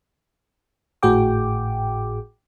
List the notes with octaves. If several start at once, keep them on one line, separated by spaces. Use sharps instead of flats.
G#1 A2 F#4 G#4 G5 D6